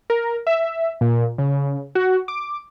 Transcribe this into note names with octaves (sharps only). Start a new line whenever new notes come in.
A#4
E5
A#2
C#3
F#4
D6